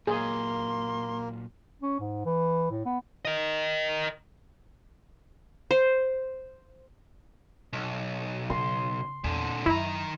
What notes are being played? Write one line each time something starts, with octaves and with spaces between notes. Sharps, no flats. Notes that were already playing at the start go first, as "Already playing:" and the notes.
A#2 F#3 A#3 G#4 C6
C#4
G#2
E3
A2
B3
A#4 D#5
C5
B1
C#3 C6
E2 A#2 D3
F#2 D#3 E4 A#5